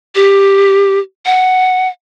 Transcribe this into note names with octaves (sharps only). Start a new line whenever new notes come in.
G4
F#5